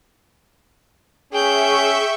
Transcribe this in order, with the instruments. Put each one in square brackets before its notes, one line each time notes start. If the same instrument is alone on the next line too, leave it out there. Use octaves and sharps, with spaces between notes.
[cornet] C#4 [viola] G#4 [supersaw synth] E5 C#6 [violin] G5 G6